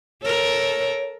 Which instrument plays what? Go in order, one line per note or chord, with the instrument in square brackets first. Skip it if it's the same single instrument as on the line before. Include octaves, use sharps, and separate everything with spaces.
[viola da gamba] A4 A#4 [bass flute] C#5